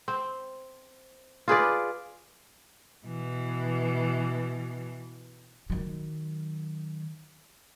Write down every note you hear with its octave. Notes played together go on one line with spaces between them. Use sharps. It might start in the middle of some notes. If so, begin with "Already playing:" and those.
C4
F4 G#4 B4 D5
B2 E3
D#3 F#3